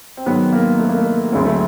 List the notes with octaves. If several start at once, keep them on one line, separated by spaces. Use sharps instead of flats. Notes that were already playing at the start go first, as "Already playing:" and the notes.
C4
G#2 D#3 F#3 B3
A#3
A3
A#3
A3
D2 D3 F#3 G#3
A3